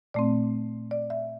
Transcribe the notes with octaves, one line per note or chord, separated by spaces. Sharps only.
A#2 A3 C4 D5
D5
E5